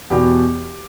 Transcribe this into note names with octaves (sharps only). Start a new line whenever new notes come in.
E2 B2 G4